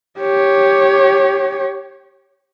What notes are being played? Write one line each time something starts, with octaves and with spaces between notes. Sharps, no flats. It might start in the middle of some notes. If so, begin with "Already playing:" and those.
G4 C#5